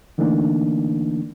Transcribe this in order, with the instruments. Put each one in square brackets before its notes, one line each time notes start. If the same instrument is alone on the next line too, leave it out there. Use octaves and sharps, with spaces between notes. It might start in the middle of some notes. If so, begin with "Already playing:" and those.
[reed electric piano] D3 E3 A3 A#3 D4 D#4